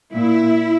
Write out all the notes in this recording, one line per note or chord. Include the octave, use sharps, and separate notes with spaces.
A#2 E4